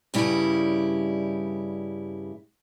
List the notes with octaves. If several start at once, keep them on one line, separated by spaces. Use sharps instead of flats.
G2 C#3 G3 E4